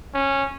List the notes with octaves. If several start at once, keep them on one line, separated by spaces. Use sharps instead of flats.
C#4